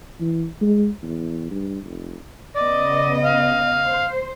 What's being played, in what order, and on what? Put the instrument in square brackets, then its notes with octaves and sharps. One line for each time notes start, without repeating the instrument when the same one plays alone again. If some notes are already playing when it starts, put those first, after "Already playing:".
[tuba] E3
G#3
E2
G2
F1
[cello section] C#3 B3 D#5 [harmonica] D5
[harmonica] F5
[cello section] C5